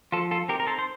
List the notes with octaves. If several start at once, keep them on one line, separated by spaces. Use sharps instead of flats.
F3 F4 A4
F4 A4
C4 D#4 G4 A#4
A#4
A4 C5
C5